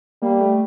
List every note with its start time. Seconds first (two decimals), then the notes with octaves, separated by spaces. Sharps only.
0.22 G3 A#3
0.41 A3